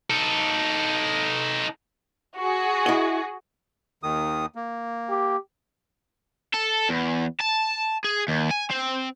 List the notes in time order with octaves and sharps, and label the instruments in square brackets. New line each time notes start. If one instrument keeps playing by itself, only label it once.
[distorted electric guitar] D#4 A4
[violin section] F#4 G#4
[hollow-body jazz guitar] E4 D#5
[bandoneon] D#2 D#3 D#6
A#3
[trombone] G4
[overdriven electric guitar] A4
E2
A5
G#4
D#2
G#5
C4